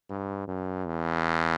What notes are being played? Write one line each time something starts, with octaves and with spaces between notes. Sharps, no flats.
G2
F#2
E2